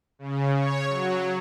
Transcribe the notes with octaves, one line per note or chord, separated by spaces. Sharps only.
C#3
C#5
F#3